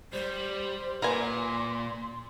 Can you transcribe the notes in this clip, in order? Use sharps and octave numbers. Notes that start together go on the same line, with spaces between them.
G3 C5
A#2 A#4 B4 G#5 C6